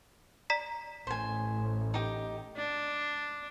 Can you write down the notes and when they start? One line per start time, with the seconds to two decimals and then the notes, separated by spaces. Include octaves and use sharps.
0.50 D5 A#5 B6
1.07 A1 C5 G#5
1.94 D#4 G4
2.57 D4